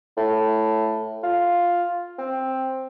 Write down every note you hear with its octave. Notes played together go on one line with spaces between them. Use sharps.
A2
F4
C4